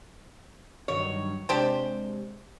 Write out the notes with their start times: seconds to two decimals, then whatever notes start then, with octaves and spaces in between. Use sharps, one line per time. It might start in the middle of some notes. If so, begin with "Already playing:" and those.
0.88 G2 D#3 F#3 C#5
1.49 C3 G#3 D4 G4 C5